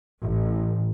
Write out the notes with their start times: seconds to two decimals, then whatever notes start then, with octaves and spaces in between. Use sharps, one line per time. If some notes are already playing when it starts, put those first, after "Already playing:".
0.23 A1